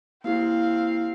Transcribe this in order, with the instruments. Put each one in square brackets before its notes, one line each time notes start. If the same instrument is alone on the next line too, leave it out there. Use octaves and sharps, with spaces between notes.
[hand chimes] A#3 E4 G4 [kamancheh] C4 F5